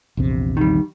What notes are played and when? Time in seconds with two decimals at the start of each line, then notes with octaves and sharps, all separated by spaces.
0.17 A#1 E2 C3
0.57 D#3 G3